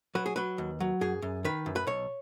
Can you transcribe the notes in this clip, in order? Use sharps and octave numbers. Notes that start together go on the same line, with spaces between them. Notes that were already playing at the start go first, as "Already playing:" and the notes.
F#3 B4
G#4
F#3 B4
D#2
F#3
F#2 G#4
F#2
D#3 B4
F#2
B4
B1 C#5